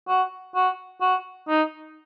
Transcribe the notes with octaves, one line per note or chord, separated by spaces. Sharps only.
F#4
F#4
F#4
D#4